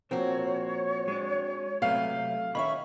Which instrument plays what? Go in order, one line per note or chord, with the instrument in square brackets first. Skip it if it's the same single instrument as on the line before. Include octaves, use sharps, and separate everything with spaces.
[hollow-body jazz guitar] A#2 F3 A#4 [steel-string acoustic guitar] C4 F#4 [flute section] C#5
[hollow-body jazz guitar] G#3 D4
[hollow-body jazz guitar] C3 F#3 B3 [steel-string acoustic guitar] A3 [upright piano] F5
[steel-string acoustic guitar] D#3 C#4 E5 [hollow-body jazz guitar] B5 [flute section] C#6